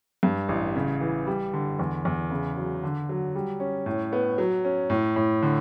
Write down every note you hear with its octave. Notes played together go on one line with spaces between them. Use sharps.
G2
A1
C#3
E3
G3
D3
E2
E2
C#3
F#3
D3
F#3
G3
C#4
A2
B3
F#3
C#4
A2
A2
D3